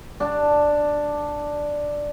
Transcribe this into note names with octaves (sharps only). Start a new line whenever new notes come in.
D4 A5